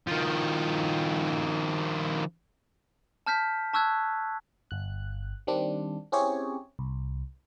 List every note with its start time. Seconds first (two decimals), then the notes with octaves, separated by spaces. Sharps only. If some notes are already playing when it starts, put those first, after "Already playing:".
0.07 D#3 F3
3.26 A5 F6 G6 B6
3.73 A5 C#6 E6 F#6 G#6
4.71 G1 F#6
5.47 D#3 G3 C4 D4
6.12 C4 C#4 E4 G4 G#4 C#5
6.79 C2